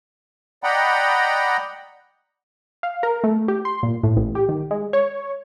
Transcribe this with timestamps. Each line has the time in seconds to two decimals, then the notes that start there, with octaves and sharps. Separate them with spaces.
0.63 D5 D#5 F#5 G5 A#5 B5
2.83 F5
3.03 A#4
3.24 A3
3.48 G4
3.65 C6
3.83 A#2
4.03 A2
4.17 A1
4.35 G4
4.49 D#3
4.71 G#3
4.93 C#5